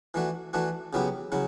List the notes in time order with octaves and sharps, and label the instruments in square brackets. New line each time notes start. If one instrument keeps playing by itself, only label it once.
[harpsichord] E3 A3 D4 F#4
E3 A3 D4 F#4
C#3 F#3 B3 E4 G4
C#3 F#3 E4